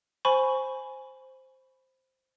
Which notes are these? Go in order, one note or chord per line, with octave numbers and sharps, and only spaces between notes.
C5 G#5 B5 C#6